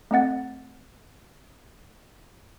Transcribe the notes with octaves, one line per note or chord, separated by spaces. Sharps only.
A3 C4 D#5 F#5 A6